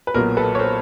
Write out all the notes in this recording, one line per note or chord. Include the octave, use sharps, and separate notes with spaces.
B4
B1 A#2 F#3 B3 A#4
A4 B4
C#5
A#4 C5